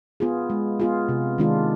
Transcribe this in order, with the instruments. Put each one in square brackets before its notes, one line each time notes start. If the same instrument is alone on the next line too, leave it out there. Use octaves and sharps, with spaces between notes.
[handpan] B3 F4 G#4
G#3
B3 F4 G#4
C3
D#3 G#3 D4 F4